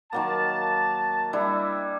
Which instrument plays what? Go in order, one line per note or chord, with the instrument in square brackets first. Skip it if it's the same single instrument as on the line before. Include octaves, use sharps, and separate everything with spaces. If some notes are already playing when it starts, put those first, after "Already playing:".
[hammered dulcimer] D#3 F#3 A#3 [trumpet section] A5
[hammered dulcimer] G3 D4 E4 [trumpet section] E5